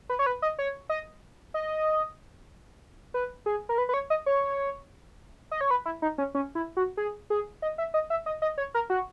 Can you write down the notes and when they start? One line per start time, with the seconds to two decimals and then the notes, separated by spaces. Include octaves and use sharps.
0.09 B4
0.19 C#5
0.26 B4
0.42 D#5
0.59 C#5
0.89 D#5
1.54 D#5
3.14 B4
3.46 G#4
3.69 A#4
3.78 B4
3.89 B4
3.94 C#5
4.10 D#5
4.26 C#5
5.51 D#5
5.61 C#5
5.71 B4
5.85 E4
6.02 D#4
6.18 C#4
6.35 C#4
6.55 E4
6.77 F#4
6.97 G#4
7.30 G#4
7.62 D#5
7.78 E5
7.94 D#5
8.10 E5
8.26 D#5
8.42 D#5
8.58 C#5
8.74 A#4
8.90 F#4